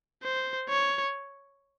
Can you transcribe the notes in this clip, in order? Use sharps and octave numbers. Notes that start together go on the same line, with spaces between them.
C5
C#5